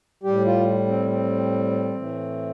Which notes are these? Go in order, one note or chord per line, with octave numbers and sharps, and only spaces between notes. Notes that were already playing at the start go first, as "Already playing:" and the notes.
A2 G3 G4
F4
C4
C4
A2 E3 A3